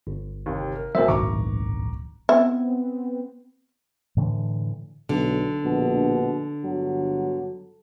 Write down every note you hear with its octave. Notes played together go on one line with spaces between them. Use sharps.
G1
D#2 C3
A#4
B1 F#2 A#4 C5 E5
D1 A#1 G#2 D#3 A#5 C#6 D6
B3 C4 E4
A2 D3 E3
B1 D3
A#1 B2
G1 F#3